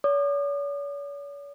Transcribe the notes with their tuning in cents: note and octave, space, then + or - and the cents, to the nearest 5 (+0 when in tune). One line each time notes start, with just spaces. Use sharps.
C#5 +45 D#6 -45